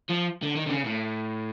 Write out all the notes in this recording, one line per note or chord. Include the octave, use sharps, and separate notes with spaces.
F3
D3
D#3
D3
C#3
A2